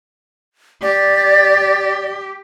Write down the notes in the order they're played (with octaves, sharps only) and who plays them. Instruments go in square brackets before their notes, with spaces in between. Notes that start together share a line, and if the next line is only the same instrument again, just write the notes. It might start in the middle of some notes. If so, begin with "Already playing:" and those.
[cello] G4 [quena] D5